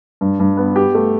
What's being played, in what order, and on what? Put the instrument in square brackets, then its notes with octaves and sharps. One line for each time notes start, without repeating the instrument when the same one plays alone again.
[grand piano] G2
G2
B3
G4
A3